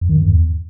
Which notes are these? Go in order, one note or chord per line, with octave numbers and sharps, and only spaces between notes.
F2
D#3
G2
E2